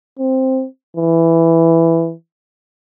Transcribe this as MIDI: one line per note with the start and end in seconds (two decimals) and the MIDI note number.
0.19 0.66 60
0.96 2.13 52